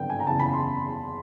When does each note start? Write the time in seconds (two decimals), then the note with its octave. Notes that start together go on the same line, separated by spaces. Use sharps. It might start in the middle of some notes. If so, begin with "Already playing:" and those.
Already playing: G#1 G2 D3 F#3 B3 G5
0.10 G#5
0.20 A#5
0.27 F#1 E2 C#3 A5
0.39 B5
0.54 C6